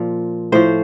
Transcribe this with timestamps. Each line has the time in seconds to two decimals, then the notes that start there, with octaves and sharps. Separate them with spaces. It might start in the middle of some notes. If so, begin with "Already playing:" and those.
Already playing: A#2 F3
0.52 A2 F3 C5